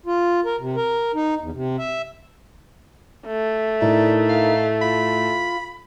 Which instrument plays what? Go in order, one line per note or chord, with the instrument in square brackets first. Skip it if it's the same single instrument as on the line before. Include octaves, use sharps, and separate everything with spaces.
[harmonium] F4
A#4
C3
A#4
D#4
E2
C3
E5
[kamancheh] A3
[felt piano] A2 [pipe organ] D#4 E4 A#4 [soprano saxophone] D5
[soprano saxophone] F5
[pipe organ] F4 [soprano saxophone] B5